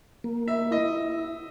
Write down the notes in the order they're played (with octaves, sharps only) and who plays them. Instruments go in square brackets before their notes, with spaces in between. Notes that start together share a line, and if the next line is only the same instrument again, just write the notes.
[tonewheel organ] A#3
[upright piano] E5
[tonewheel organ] E4 [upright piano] D#5